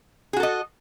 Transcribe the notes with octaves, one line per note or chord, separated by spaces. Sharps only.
F#4 G#4 A4 D#5